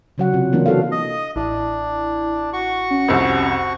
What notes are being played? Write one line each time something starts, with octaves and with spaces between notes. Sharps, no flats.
C#3 F#3 F#5
C3 F4
E3 A#3 B3 D4 F4
F#4 A4 F5
D#5 D#6
A1 D4 E4
F#4 C#6
C#4
C2 F2